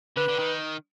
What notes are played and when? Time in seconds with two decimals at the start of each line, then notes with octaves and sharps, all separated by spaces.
0.17 D3 B4
0.29 D3
0.39 D#3